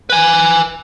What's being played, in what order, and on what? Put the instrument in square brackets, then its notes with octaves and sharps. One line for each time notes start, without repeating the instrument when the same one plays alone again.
[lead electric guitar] B4 G#5